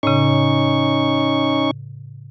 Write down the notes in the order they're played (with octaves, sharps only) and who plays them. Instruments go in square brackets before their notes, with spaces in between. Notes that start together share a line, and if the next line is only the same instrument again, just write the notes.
[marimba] A2 C#3 [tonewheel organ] C#4 D#4 C#6